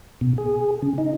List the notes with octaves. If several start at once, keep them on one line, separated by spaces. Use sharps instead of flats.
B2
G#4
C#3
D#4